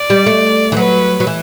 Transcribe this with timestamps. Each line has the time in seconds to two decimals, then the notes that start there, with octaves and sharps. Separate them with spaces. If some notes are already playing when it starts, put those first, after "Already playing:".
Already playing: D5
0.10 G3
0.26 A3
0.72 E3
0.77 F#3 B4
1.20 F#3
1.27 E3